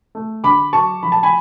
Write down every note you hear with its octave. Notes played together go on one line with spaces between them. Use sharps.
A3
D3 B5 D6
F#3 A5 C#6
F3 B5
A5
G#5 B5